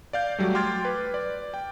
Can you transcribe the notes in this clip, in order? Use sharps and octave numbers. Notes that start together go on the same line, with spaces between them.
D5 F5 G6
F#3 G3 A3
G5 C6 D6 F6 G#6 A6
B4
D5
G5